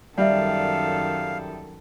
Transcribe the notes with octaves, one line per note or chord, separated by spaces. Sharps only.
F#2 D#3 G3 A4 D5 E5 F5